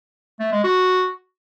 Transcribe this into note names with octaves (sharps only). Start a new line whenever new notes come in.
A3
G#3
F#4